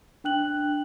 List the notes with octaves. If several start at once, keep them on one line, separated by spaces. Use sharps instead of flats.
D4 G5 F#6 F#7